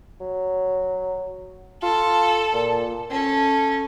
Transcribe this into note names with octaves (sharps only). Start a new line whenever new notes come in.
F#3
F4 A4
A#2
C#4 A4